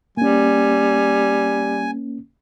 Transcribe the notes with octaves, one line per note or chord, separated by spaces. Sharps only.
G3 A#3 C#4 G#5